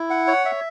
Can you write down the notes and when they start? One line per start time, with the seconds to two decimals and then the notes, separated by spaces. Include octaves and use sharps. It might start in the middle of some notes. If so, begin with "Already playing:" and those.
Already playing: E4
0.10 F#5
0.27 C#5
0.45 E5